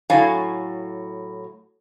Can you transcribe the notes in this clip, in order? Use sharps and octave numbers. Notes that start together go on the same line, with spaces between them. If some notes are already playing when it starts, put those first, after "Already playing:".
A2 F#3 F5 G#5